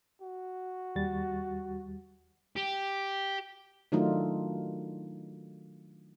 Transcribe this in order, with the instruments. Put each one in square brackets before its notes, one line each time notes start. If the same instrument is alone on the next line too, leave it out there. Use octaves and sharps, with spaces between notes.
[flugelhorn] F#4
[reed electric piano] D#2 G3 A6
[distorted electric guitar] G4
[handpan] D#3 F#3 A3 D4 D#4 F4